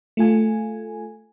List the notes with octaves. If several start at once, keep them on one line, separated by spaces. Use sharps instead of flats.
A3 F4 G#5